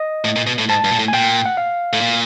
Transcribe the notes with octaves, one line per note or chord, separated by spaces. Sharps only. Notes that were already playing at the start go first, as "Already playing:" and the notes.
Already playing: D#5
A2
A#2
B2
A2
G#2 A5
G2
A#2
A2
G#5
A#2 G5
F#5
F5
A2
A#2